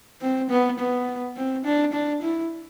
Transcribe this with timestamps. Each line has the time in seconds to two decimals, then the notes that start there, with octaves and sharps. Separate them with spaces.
0.21 C4
0.50 B3
0.78 B3
1.36 C4
1.64 D4
1.92 D4
2.22 E4